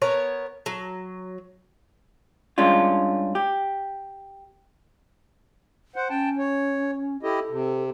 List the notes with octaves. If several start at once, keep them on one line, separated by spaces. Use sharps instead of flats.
B3 A#4 C#5
F#3
G2 G#3 C#4 D4 F4
G4
C5 F#5
C#4 G5 A5
C#5
E4 G4 A4 D#5
C3